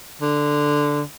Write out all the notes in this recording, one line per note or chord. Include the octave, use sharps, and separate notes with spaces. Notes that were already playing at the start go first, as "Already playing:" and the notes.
D3